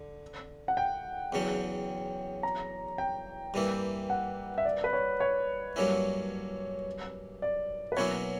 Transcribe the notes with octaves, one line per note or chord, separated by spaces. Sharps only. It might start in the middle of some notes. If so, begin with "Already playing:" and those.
Already playing: D3
F#5
G5
E2 C#3 F#3 C#4
A#5
G5
G2 E3 A#3 E4
F#5
E5
D5
B4
C#5
C#5
G2 F#3 A#3 C#4 E4
D5
B4
B2 F#3 A#3 C#4 E4 C#5